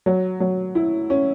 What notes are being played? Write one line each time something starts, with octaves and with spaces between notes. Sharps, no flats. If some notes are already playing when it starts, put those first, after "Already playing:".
F#3
F#3
E4
C#4